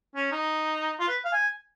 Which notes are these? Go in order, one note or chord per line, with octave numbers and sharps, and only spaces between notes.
C#4
D#4
F4
B4
F5
G#5